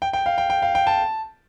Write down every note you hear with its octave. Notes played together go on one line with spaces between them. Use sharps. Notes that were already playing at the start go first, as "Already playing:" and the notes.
G5
G5
F5
G5
G5
F5
G5
A5